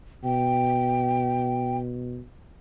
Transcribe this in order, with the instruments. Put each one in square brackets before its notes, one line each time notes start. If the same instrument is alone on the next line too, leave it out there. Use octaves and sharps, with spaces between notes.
[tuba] B2 [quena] G5